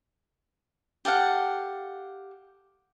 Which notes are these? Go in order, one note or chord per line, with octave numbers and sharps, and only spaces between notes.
G4 A4 F5 F#5